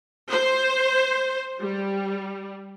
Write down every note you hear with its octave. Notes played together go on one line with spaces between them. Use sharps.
C5
G3